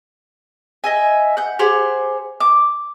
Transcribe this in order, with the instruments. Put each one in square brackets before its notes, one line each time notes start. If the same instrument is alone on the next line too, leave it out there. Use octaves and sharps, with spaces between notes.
[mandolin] D#5 E5 G#5
F#5 G6
G4 G#4 C5 F#5
D6